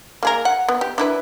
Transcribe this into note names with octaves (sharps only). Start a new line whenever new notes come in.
A#3 G#4 A#4
F#5
B3
G4
D4 E4 B4